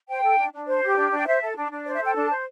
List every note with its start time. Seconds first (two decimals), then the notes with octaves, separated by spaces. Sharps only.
0.09 C5 G5
0.23 A4
0.38 D4
0.52 D4
0.67 C5
0.82 G4
0.97 D4
1.11 D4
1.17 G5
1.26 C5 E5
1.41 A4
1.56 D4
1.71 D4
1.86 C5 D5
1.95 E5
2.00 A4 G5
2.15 D4 A5
2.29 C5